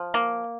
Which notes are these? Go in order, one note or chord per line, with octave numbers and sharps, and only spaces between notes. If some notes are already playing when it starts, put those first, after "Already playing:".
Already playing: F3
A#3